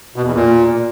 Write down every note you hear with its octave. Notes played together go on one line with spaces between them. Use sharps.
B2
E2
A#2